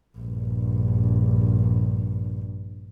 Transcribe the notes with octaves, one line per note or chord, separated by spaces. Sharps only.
A#1 G2